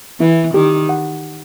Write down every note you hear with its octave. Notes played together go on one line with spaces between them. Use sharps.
E3 E4
D#3 G4
F#5